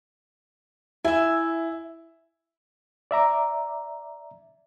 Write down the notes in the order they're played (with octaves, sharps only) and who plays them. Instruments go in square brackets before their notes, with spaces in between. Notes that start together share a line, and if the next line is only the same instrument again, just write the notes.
[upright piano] E4 [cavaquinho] E5 G#5
[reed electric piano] D5 E5 A#5 D6